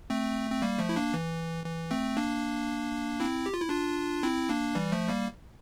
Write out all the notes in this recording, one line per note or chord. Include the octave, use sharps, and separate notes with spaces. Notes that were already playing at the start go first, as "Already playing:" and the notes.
A3 C4
C4
G3 A#3
F3 A3
E4
A#3 D4
E3
E3
A3 C4
A#3 D4
C4 E4
G4
F4
E4
D4 F4
C4 E4
A#3 D4
E3 G3
F3 A3
G3 A#3